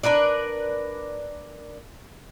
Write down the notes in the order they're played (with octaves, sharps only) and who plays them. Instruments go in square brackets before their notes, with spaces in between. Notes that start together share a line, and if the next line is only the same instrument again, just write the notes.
[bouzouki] D4 A#4 B4 D5